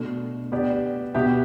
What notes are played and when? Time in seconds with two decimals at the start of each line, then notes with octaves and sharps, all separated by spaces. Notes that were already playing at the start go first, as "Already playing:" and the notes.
Already playing: B2 A3 D4
0.52 B3 G4 D5
1.14 B2 B3 G4 E5